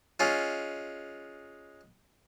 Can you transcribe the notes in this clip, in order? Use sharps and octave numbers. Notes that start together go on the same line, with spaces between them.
G#3 C#4 F4